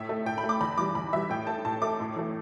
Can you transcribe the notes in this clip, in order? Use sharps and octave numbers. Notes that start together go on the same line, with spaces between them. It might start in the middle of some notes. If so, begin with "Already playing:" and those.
Already playing: A2 E5
A3
A2 G5
B5
A3
D6
E2 B5
E3 G3 D6
E2 B5
E3 G3 E5
A2 G5
A3 A5
A2 A5
A3 D6
A2
E3 A3